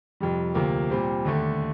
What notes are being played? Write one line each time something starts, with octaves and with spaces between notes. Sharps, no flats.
F2 C3 G3
D2 C3 F3 A#3
A#2 G3 C4
D#2 D3 A3